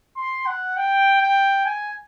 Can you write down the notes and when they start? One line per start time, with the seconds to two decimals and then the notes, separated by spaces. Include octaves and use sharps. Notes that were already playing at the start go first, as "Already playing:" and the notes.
0.17 C6
0.46 F#5
0.77 G5
1.21 G5
1.66 G#5